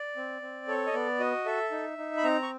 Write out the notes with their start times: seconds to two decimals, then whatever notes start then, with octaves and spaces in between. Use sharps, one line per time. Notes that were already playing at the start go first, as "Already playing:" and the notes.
Already playing: D5
0.17 C4
0.42 C4
0.68 A4 C#5
0.86 D#5
0.94 B3 D5
1.20 F#4 D#5
1.46 A4 E5
1.71 D#4
1.98 D#4
2.17 B5
2.24 C4 A#5
2.43 C#6